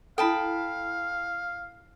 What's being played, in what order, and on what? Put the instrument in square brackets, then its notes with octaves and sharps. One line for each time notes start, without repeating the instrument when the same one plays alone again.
[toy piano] E4 A4 [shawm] F5 [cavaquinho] G5 A5 B5